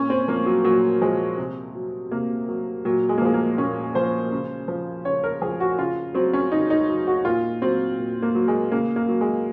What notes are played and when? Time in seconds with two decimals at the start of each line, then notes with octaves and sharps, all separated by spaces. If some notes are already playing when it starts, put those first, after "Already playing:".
Already playing: A#2 C#4
0.10 C4
0.28 F3 A#3
0.46 F#3
0.64 A#2 F#3
1.01 F3 G#3
1.38 C3
1.75 F#3
2.11 C3 A#3
2.48 F#3
2.85 A#2 F#3
3.09 G#3
3.18 A#3
3.21 F3 G#3
3.34 A#3
3.58 A#2 C#4
3.95 F3 C5
4.32 C#3
4.68 F3
5.05 C#3 C#5
5.24 A#4
5.42 F3 G#4
5.60 F#4
5.78 C#3 F4
6.14 F#3 C4
6.33 C#4
6.52 C#3 D#4
6.70 D#4
6.89 F#3
7.07 F#4
7.25 A#2 F4
7.62 F#3 C4
7.99 A#2
8.22 A#3
8.35 F#3
8.48 G#3
8.72 C#3 A#3
8.96 A#3
9.09 F#3
9.21 G#3